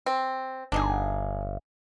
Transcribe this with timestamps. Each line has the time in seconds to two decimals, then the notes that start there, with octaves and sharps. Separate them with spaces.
0.06 C4
0.72 G1 D4 D#4 G#4